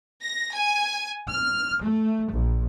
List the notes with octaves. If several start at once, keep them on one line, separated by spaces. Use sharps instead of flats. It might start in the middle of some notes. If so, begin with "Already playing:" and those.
A#6
G#5
F6
A3
A#1